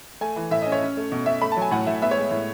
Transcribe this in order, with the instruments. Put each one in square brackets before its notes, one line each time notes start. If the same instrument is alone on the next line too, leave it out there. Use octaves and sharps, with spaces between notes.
[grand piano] A3 G#5
E3
A2 E5
D#5
C#4
C#5
C#4
A3
B2
B2 E5
A3 B5
A5
F#3
G#5
A2 F#5
A2 E5
B3 E5
C#5
G#3
A2